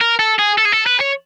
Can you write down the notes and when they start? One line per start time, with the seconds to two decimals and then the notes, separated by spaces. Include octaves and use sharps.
0.01 A#4
0.19 A4
0.39 G#4
0.58 A4
0.65 G#4
0.72 A4
0.87 B4
1.01 C#5